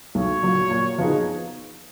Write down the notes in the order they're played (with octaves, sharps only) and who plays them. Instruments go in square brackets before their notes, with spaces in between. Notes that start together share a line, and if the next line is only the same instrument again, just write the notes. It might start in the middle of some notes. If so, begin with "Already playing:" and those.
[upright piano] B1 [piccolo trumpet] C#5
[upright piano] A#2 F#3 A#3
A#2
F3 B3 D#4 G#4